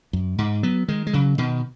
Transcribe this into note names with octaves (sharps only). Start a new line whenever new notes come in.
F#2
G#2
F#3 B3
D#3 G#3
G#3
C#3 F#3
B2 D#3